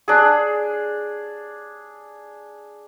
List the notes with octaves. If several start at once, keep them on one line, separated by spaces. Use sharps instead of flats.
D4 G#4